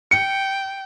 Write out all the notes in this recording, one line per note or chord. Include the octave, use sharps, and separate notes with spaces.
G5 C#7